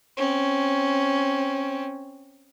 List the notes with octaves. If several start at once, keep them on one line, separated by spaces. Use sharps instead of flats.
C4 C#4